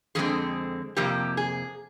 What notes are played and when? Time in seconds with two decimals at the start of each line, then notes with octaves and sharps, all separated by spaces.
0.15 F2 D3 G#3 C4 G#4
0.96 F2 C3 F3 A#3 G4
1.37 G#4